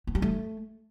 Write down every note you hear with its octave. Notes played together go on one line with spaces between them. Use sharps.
B3
G3
A3